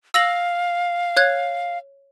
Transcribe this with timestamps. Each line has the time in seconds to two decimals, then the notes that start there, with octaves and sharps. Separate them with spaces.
0.14 F5 E6 A#6 F#7
1.17 C#5 F#6 G#6